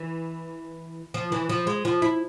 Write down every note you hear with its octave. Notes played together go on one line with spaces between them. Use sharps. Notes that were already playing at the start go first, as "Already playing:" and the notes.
Already playing: E3
F3
E3
F3
G#3
F3
E4